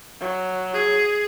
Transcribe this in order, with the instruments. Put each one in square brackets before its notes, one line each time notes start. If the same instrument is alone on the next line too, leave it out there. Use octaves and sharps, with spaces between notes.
[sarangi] F#3
[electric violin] G#4